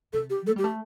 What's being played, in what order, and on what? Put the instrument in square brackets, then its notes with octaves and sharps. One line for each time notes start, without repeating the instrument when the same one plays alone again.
[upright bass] C3 [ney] A4
[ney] G4
[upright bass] A#3 [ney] A4
[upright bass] G3 [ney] G4
[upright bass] A3